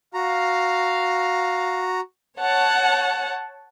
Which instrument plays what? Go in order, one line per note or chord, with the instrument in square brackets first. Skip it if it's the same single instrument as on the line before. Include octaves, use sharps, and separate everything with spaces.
[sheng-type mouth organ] F#4 A#5 [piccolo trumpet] F5
[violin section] C#5 F#5 A5